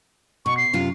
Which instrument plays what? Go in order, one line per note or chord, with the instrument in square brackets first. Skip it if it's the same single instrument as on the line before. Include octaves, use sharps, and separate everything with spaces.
[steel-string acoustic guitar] B2 [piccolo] C#6
[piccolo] C7
[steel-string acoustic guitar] F#2 C3 F4